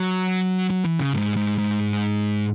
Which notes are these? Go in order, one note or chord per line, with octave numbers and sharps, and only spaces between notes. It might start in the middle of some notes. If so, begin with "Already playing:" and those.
Already playing: F#3
F#3
E3
C#3
G#2
G#2
G#2